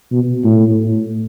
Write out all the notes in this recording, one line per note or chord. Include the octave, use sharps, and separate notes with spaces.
B2
A2